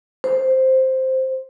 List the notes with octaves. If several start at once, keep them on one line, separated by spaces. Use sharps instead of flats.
C5